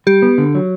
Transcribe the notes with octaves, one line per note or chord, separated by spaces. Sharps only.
G3 G4
B3
D3
F#3